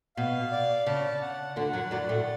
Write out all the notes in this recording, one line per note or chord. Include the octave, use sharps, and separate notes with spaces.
B2 F5
D5
C#3 A5
F#5
D2 D3 F#5
F#2 F#3
F#2 F#3 D5
A2 A3